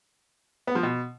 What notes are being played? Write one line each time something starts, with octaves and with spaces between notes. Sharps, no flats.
B3
F3
B2